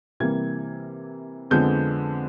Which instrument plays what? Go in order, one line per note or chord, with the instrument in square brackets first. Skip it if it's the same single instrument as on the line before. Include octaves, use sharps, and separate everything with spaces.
[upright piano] C3 E3 G3 A#3 G#6
F2 D3 F3 G#3 B3 G6